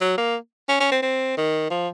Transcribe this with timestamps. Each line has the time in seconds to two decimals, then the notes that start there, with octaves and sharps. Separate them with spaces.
0.01 F#3
0.18 A#3
0.69 C#4
0.80 C#4
0.91 C4
1.02 C4
1.37 D#3
1.70 F3